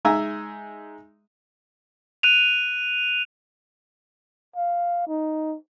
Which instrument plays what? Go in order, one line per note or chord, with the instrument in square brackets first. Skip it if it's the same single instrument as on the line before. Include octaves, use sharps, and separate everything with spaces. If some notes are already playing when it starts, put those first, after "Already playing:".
[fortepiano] G#3 D#4 E5 G#5 A#5
[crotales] F#6 D#7 F7
[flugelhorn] F5
D#4